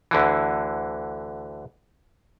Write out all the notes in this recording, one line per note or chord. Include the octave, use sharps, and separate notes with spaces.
D2 D3 E3